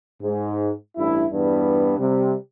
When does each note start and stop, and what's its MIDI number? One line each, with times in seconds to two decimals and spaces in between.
0.21 0.71 44
0.97 1.24 33
0.97 1.24 43
0.97 1.24 64
1.31 1.94 40
1.31 1.94 43
1.31 1.94 55
1.31 1.94 59
1.98 2.34 48
1.98 2.34 55